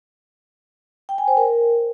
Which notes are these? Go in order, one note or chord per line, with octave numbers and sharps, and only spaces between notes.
G5
G#5
C5
A#4